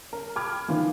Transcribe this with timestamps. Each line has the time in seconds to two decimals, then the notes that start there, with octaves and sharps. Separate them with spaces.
0.13 A#4
0.36 G5 B5 D6 F6 G#6
0.68 D#3 E3 F4 B4